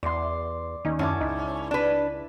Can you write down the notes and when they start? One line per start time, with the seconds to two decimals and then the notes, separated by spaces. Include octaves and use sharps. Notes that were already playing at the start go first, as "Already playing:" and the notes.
0.03 E2 D5 C6
0.85 D#2 C#4 D#4
0.99 F#2 C#4 E4 A5 D6
1.21 C#2 D#4
1.71 D4 B4